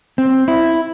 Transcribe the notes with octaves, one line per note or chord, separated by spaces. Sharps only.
C4
E4